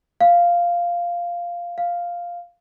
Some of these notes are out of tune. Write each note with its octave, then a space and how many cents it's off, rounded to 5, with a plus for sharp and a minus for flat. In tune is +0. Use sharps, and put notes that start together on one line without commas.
F5 -5
F5 +0